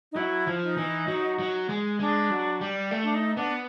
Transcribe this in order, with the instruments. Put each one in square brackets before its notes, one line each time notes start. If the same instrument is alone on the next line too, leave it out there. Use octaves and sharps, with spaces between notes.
[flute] D#4
[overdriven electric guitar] F#3 [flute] E4
[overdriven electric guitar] F3
[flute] D#4
[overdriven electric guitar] E3
F#3
F#3
G#3
[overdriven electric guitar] G#3 [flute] D4
[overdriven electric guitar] F#3
G3
A3
[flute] D4
D#4
[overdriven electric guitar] B3 [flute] D4